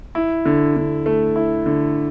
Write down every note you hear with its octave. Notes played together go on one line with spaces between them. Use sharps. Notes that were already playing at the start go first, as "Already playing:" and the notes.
E4
D3
D3
A3
E4
D3